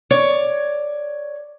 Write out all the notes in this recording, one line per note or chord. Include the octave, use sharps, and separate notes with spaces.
C#5 D5